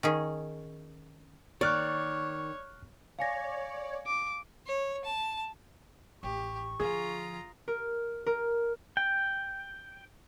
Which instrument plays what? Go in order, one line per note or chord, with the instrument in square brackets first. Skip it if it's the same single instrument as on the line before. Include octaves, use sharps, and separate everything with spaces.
[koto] D#3 C#4 G#4
[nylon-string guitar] D#3 A#3 [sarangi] C#5 [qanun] D5 [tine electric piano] C#6 F6 F#6
[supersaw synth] C#5 D5 [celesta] F5 G#5 A#6
[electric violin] D6
[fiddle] C#5
A5
[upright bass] A1 [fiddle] G4 [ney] C#6
[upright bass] D3 F3 [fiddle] F4 A#5 [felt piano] G#4
[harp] A#4
A#4
[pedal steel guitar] G5